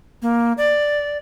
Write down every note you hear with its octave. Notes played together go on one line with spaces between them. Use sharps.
A#3
D5